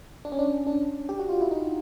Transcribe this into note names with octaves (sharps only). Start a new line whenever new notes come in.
D4
C#4
D4
D4
G4
F#4
F4
E4
D#4